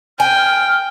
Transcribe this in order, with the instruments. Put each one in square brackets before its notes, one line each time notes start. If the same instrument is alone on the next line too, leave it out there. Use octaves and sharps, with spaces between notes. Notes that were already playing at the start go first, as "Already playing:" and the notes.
[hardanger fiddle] G5 [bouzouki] G#5 [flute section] F6